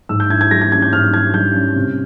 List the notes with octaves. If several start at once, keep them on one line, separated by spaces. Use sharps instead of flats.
G#2 E6
G6
E4 G#6
G#6
G3 A#6
G#6
C#4 G#6
G6
G#2 F6
E4 G#6
G3 G6
C#4
C3